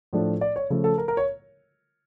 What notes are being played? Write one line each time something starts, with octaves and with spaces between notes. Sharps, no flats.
A2 F3 A3 D4
D5
C#5
C#3 F3 A3
A4
A#4
A#4
C#5